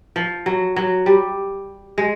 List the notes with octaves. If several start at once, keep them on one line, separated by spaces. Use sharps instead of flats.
F3
F#3
F#3
G3
G#3